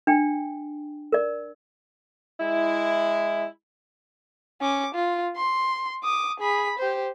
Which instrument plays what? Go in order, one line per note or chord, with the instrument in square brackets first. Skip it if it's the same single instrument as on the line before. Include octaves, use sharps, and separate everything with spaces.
[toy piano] D4 G5
A#4 D5
[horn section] G#3 E4
[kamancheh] C#4 D6
F4
C6
D6 D#6
G#4 B5
G4 C5